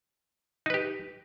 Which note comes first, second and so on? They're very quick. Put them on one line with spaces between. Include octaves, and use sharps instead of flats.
D#4 B4 G4